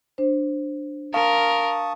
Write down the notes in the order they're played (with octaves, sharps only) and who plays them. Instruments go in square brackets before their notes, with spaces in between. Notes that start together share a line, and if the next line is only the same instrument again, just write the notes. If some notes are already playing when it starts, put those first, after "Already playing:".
[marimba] D4 C5
[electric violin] A#4 [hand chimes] F5 [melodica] A5 C#6 D#6